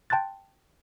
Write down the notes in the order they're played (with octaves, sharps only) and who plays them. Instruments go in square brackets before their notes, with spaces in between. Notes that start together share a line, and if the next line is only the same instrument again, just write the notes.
[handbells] G5 A5 C6 F#6 A6